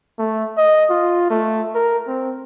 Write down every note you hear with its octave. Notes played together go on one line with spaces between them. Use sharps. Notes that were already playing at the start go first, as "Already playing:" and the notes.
A3
D#5
F4
A3
A#4
C4